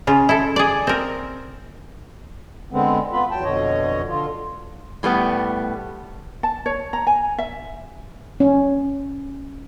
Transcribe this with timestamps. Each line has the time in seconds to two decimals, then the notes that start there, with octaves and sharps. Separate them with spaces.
0.07 C#3 F4
0.29 E4 A4
0.56 G#4 D5
0.87 C4 A#4
2.72 D3 G#3 B3 C4
3.12 B3 F4 B4
3.31 E2 F#3 G5 A5
3.44 F2 B2 D3 C#5 D#5
4.09 D3 F4
5.03 A2 G3 A3 B3
6.43 A5
6.66 C#5
6.93 A#5
7.07 G#5
7.38 E5
8.40 C#4